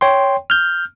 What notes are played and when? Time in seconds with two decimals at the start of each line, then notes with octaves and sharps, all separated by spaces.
0.01 C#5 G5 C6
0.50 F6 G6